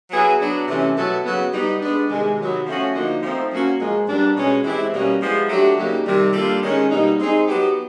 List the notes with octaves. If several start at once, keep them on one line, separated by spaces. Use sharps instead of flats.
F#3 B3 E4 G#4
F#3 B3 D4
C3 E3 A3 C#4
B2 F#3 B3 E4 A4
C#3 F#3 B3
G3 B3 D#4
G#3 B3 D4
C3 D#3 G#3
C3 D#3 F#3 B3
F3 A3 C#4 F#4
D3 F3 A#3 D#4 F#4
F3 A3 C4 D#4
F#3 A#3 C#4 F#4
A#2 F3 G#3
A#2 G3 B3 D4
B2 G#3 C#4
E3 G#3 C4 E4 G4
B2 G3 A#3 C#4
F3 G#3 B3 E4 G4
F#3 A3 D4 G4
C#3 F#3 A#3 D#4 G4
C3 D#3 G3
G3 A#3 D4 F4 A4
D#3 G#3 C#4
B2 G3 A#3 D#4
G#3 C4 D#4 G#4
F#3 B3 D#4 G4